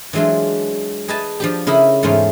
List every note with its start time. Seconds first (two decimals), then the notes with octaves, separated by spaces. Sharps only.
0.13 E3 F#3 G#3 D4 F4
1.08 G#4 B4 D#5 G#5 A5
1.40 F3 D4 G4
1.67 C#3 E4 A#4 D#5 B5
2.03 E2 G#2 A3 C#4 F4 C5